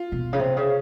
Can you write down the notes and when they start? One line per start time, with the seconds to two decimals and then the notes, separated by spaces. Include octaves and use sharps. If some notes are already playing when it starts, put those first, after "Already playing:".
Already playing: F4
0.12 B2
0.33 C#3
0.39 C3
0.57 C#3